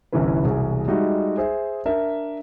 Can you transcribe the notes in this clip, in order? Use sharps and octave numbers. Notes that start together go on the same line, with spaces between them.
G1 C2 G2 E3 C#4 B4
E1 C2 G#4
G3 G#3 D#4 F#4 D#5 E5
G#4 C5 E5
D4 A#4 E5